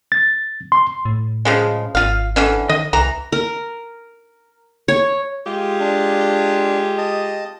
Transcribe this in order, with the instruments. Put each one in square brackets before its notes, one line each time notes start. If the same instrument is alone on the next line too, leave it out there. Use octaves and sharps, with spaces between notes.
[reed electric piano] A6
C6
[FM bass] A2
[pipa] C#3 F3 G#3
[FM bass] G#1 [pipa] F4 F5
[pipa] D3 E3 C#4
[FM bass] D#3 [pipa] D#5
[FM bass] C2 [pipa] E3 A#5
[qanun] A#4
C#5
[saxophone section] G#3 F4 G4
[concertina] D4
D#5 A5